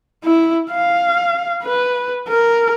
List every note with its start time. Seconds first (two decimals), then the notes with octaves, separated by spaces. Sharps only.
0.24 E4
0.72 F5
1.63 B4
2.28 A#4